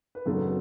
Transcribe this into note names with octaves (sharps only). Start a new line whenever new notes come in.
B4
G#1 F#2 C#3 F#3 B3 A4